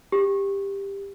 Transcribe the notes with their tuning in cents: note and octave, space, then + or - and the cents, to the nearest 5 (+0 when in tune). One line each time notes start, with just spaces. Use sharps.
G4 +15